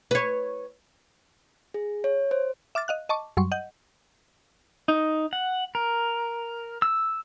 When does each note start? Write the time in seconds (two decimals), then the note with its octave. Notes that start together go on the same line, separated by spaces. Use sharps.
0.11 B4 C#5
1.74 G#4
2.04 C#5
2.31 C5
2.75 E5 D6 F6 A6
2.88 D#5 F5 F#6
3.09 D#5 A5 C#6 D6
3.37 F#2 F#3 G3 C6 C#6
3.52 D#5 F#5 G6
4.88 D#4
5.33 F#5
5.75 A#4
6.82 E6